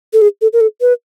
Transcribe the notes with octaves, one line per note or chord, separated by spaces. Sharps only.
A4
G#4
A4
A#4
A4
B4